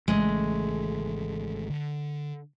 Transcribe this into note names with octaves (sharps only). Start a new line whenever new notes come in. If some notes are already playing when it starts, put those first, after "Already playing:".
G#1 C#3 E3 G#3 A3
D3